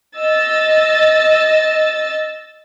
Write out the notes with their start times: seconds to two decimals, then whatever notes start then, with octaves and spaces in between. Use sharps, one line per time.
0.17 D#5 E6 A6